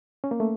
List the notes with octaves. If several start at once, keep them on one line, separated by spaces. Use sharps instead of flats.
C#4
A#3
A3